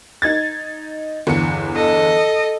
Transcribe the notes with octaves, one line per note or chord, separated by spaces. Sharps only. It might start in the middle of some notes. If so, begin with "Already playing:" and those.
D#4 G#6 A6
G1 E2 C#7
A4 D#5